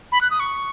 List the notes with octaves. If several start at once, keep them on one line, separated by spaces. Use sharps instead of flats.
B5
F#6
D#6
C#6